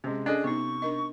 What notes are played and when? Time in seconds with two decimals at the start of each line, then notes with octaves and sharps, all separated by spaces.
0.04 C3 G#3 C#4
0.26 C#4 D4 G#4 A4 D#5
0.44 C3 B3 D#4 C#6
0.82 D4 A#4 D#5